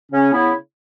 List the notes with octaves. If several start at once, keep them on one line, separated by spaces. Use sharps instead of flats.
C#3 C#4
C#3 B3 E4